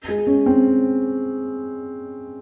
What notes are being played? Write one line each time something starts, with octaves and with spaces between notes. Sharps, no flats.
G#3
C#4
C4